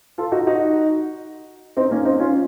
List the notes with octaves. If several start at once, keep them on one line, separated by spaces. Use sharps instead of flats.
F4 A4
D#4 F#4
D#4 F#4
C4 D#4
A#3 C#4
C4 D#4
C#4 F4